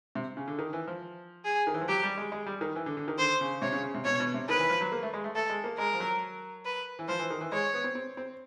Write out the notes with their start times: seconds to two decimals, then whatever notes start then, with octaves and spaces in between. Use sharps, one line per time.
0.15 C3
0.37 C#3
0.48 D3
0.59 D#3
0.73 E3
0.87 F3
1.45 G#4
1.67 D#3
1.74 E3
1.81 F3
1.88 F#3 G4
2.03 G3
2.17 G#3
2.32 G#3
2.46 G3
2.61 D#3
2.76 E3
2.86 D3
2.97 D3
3.08 D#3
3.18 D3 C5
3.41 C#3
3.62 C3 C#5
3.72 C#3
3.84 C#3
3.94 C3
4.05 B2 C#5
4.20 B2
4.34 C3
4.49 D#3 B4
4.59 E3
4.70 F3
4.81 F#3
4.92 A#3
5.03 A3
5.13 G#3
5.24 A3
5.35 A3 A4
5.49 G#3
5.64 A#3
5.78 G#3 A#4
5.94 F3
6.00 F#3
6.65 B4
6.99 E3
7.08 F3 C5
7.19 E3
7.30 D#3
7.41 E3
7.52 G#3 C#5
7.73 B3
7.84 C4
7.95 C4
8.17 C4